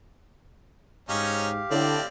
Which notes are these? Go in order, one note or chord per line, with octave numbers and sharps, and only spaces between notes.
G#2 C#4 D#4 G4 C#5 F5
A2 D3 C4 D5